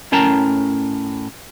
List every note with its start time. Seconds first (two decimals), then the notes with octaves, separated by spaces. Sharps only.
0.12 A2 C#4 A#4 G5 A5 A#5